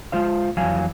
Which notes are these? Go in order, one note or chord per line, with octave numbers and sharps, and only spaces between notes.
G#3 F4 C5 F5
F2 E3 F#3 F5 G#5